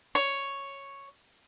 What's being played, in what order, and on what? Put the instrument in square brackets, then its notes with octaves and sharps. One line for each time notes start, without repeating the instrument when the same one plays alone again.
[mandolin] C#5